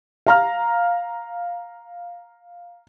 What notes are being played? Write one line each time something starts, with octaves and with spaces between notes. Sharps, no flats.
F5 A#5 F6